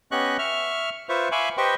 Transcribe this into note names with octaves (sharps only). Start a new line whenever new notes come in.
B3 C#4 G4 D#5 C#6 F#6
E5 C#6 F6
F4 B4 C5 E5 C#6
E5 F5 G#5 B5 C#6 D6
G4 B4 C5 D#5 G5 C#6